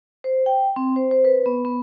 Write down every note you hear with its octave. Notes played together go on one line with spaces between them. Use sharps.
C5
G5
C4
C5
C5
B4
B3
B3